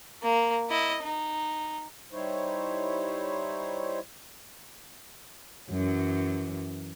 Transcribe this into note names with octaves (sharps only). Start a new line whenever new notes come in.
A#3
E4 D#5
D#4
G3 D#4 E4 C5 C#5
F#2 E3 F#3